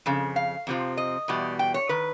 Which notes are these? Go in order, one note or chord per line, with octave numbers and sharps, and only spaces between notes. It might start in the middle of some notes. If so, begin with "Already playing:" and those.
F2 C#3
F5
F2 C3 F3
D#5
E2 B2 G3
G5
C#5
D#3 B4